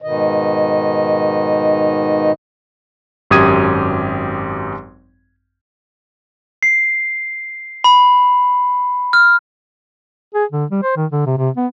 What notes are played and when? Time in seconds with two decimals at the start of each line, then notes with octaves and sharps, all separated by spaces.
0.02 G#2 B2 D#3 D#5
3.30 G#1 F#2 G4 D#6 G#6 D#7
6.63 C7
7.84 B5
9.13 F6
10.34 G#4
10.51 D3
10.71 G3
10.83 C5
10.97 D#3
11.12 D3
11.26 C3
11.38 C3
11.57 B3